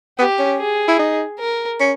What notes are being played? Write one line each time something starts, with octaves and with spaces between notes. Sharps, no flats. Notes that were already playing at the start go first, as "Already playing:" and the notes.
B3 G4
C#4
G#4
E4
D#4
A#4
C#4